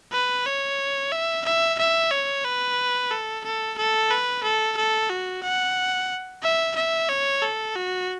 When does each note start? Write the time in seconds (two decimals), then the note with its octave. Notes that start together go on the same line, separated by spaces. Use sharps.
0.12 B4
0.46 C#5
1.12 E5
1.45 E5
1.78 E5
2.11 C#5
2.44 B4
3.11 A4
3.44 A4
3.78 A4
4.10 B4
4.43 A4
4.77 A4
5.10 F#4
5.43 F#5
6.43 E5
6.76 E5
7.09 C#5
7.42 A4
7.75 F#4